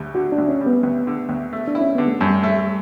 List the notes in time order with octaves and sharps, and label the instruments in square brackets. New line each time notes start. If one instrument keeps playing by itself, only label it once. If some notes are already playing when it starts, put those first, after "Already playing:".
Already playing: [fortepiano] D2 G3
[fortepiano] D3 [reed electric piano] F#4
[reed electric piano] D4
[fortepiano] D2
[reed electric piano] C#4
[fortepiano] G3
[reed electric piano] B3
[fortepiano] D2 [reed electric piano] B3
[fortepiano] D3
D2
A3
[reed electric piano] D4
[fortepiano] E4
[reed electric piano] C#4
[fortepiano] D3 [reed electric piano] B3
[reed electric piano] A3
[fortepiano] F#2 [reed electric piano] G3
[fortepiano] A3